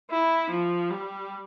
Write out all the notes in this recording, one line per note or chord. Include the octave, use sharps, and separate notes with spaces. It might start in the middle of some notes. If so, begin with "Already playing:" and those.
E4
F3
G3